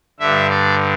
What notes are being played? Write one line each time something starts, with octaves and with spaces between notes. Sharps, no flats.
G2 D3 E5
D5